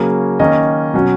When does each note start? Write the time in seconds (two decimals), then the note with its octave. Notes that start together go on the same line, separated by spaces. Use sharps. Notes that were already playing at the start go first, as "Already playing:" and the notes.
Already playing: C#3 F#3 A#3 C#4
0.40 D#3 A#3 C#4 D#5
0.94 B2 F#3 C#4